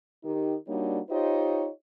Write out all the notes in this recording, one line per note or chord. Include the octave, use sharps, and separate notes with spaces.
D#3 D#4 G4
G3 A#3 D4 D#4 F#4 C#5
D#4 F4 G4 C5 C#5 D#5